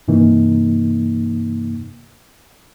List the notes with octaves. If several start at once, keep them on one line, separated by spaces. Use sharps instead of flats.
G2 C3 E3 A#3 D#4